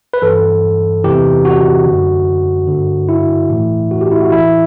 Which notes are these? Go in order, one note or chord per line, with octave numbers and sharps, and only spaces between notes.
B4
G2 E3 A4
E2 C3 E3 G4
F#4
D3
F#2
D3
G2
E4
A2 E3
F#4
G4
E4
F#4
A2 E3 E4